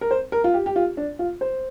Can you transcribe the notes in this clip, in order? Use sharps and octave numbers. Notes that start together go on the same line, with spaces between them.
A#4
C5
A#4
F4
G4
G4
F4
D4
F4
C5